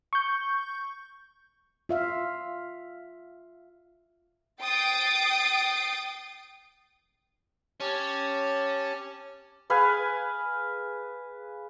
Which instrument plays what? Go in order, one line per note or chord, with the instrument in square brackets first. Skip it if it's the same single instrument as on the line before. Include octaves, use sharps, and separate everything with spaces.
[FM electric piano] C#6 G6
[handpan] F4 E5 F5
[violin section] G5 D#6 A6 C7 D7
[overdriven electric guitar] C#4 [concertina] G4 A5
[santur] G#4 B4 F5 G#5